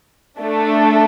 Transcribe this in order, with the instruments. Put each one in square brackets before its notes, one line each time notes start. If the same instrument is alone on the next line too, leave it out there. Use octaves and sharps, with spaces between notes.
[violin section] A3 D4 A4